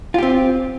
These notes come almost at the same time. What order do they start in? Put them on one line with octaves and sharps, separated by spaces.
F4 G4 C4